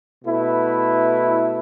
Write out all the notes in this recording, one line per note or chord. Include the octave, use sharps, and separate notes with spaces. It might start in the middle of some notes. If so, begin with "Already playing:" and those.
B2 A3 E4 B4